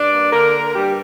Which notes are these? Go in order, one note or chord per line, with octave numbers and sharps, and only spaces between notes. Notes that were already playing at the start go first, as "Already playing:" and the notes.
Already playing: G2 D4 D5
A#3
D3 A#3 A#4
A#3
G2 G3 G4